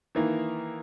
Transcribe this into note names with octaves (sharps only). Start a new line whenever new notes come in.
D#3 E3 A#3